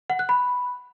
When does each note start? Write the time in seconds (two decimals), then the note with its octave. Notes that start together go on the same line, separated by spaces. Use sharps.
0.10 F#5
0.19 F#6
0.29 B5